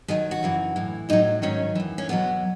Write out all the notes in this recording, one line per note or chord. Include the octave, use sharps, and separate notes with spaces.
D#2 D#3 F#3 G#4
F#4
F#2 C#3 E3
A2 E3
A2 F#3 D#4
G#2 D#3 F#3 C#4
F#2 E3
C#4
E2 B2 F#3 B3